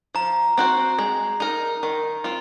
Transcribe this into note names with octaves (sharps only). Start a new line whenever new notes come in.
F3 A#5
C4 F#4 C5
G#3
D#4 A#4
D#3
C4 F4